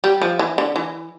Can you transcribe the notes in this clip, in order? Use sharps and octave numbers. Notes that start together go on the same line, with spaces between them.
G3
F3
E3
D3
E3